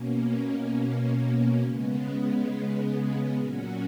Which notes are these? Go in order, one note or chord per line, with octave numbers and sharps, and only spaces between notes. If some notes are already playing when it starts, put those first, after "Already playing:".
Already playing: B2 A#3 C#4
C#3 G#3 B3
A#2 F#3 C#4 F#4